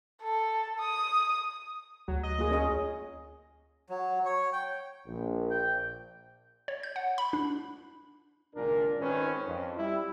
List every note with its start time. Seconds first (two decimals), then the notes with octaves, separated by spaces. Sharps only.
0.23 A4
0.79 D#6
2.08 D2 F#3
2.23 D#5
2.38 A#3 F4 G#4
2.51 C#4 G#4 D#5
3.89 F#3
4.25 C#5
4.53 G5
5.06 A#1
5.51 G5
6.68 C#5
6.83 G6
6.96 F#5
7.18 B5
7.33 D4
8.54 G#1 C#2 A#2 D4 A#4
8.99 G#1 D#3 C4 C#4 B4
9.46 F2
9.78 G3 E4